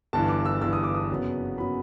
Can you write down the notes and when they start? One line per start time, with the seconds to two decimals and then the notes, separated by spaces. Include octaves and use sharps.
0.13 G1 G2 E3 A5
0.29 D6
0.45 E6
0.62 G1 G2 E3 E6
0.73 D#6
0.84 D6
0.94 D#6
1.10 F#1 F#2 C#3 F#3 B3
1.58 C#3 F#3 B3 B5